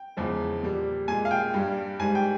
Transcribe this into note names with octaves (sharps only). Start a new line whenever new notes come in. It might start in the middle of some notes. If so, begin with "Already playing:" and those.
Already playing: G5
E2 C#3 F3 G#3
A#2 G3
A#2 G#3 G#5
F5
G5
G2 G3
G#2 G3 G#5
G5